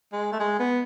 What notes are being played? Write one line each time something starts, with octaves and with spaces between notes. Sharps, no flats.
G#3
A3
G#3
B3